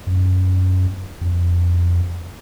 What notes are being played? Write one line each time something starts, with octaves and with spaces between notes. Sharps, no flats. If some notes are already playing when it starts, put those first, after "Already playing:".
F#2
F2